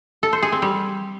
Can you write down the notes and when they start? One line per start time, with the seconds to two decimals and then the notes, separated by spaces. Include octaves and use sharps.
0.23 A4
0.33 C5
0.43 G#4
0.52 C4
0.62 G3